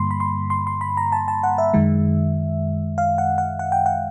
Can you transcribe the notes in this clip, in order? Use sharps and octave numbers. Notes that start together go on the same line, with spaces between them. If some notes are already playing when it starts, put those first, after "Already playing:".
Already playing: G2 D3 G3 A#3 B5 C6
B5
C6
C6
C6
B5
A#5
A5
A5
F#5
E5
F#2 D#3 G#3
F5
F#5
F#5
F#5
G5
F#5